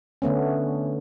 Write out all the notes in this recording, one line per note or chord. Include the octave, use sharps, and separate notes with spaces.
D3 A3 B3 C#4